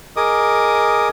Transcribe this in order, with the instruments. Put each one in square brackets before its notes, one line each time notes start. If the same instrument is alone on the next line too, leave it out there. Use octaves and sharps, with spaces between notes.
[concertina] G#4 A#4 D#5 D6 D#6